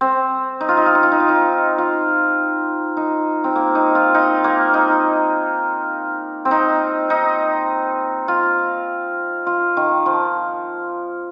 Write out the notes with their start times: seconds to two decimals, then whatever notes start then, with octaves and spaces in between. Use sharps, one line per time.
0.01 C4
0.61 D#4
0.69 F4
0.77 D#4
0.86 F4
0.95 D#4
1.03 F4
1.12 D#4
1.20 F4
1.29 D#4
1.78 F4
2.97 D#4
3.44 C4
3.55 A#3
3.75 D#4
3.95 F4
4.15 D#4
4.44 A#3
4.74 D#4
6.45 C4
6.51 D#4
7.10 D#4
8.28 F4
9.47 F4
9.77 D#3
10.06 F3